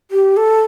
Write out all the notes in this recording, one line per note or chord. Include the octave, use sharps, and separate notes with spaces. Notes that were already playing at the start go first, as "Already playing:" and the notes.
G4
A4